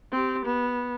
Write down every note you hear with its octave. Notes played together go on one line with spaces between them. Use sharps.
C4 G4
B3